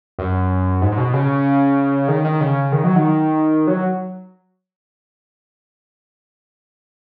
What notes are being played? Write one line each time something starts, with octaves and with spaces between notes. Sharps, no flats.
F#2
G#2
G#2
B2
C#3
D#3
D#3
C#3
D#3
F#3
D#3
F#3